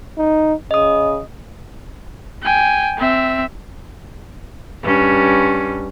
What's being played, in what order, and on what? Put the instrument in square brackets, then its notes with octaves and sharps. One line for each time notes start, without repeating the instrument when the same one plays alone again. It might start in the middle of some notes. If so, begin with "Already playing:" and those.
[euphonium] D#4
[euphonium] C#3 [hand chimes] D#5 D#6
[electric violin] G5 G#5
C4 E5
[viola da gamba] G2 C#4